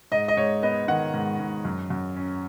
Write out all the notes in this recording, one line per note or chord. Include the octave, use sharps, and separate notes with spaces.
G#2 D#5
D#5
G#2 C#5
B3 D#5
D#3 F#5
G#2
G#2
F#2
F#2
C#4